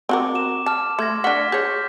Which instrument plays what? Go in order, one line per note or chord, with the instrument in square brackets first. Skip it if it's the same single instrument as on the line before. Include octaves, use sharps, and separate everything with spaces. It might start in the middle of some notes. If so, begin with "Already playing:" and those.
[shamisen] C4 F#4 A#4 [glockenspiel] C#6 D6
[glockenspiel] D6 E7
[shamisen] A5 [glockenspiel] D6 F6
[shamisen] A3 [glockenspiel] C6 G#6 A#6
[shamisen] D4 F#5 [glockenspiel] C#6 F6 B6
[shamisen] G#4 C#5 [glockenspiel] G6